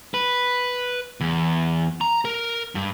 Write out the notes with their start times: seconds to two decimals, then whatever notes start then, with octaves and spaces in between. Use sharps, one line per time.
0.14 B4
1.21 E2
2.01 A#5
2.25 A#4
2.75 G2